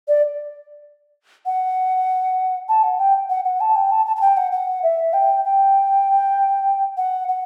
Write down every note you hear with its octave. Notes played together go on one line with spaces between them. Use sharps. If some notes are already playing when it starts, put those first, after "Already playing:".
D5
F#5
A5
F#5
G5
F#5
F#5
A5
G5
A5
A5
A5
G5
F#5
F#5
E5
G5
G5
F#5
F#5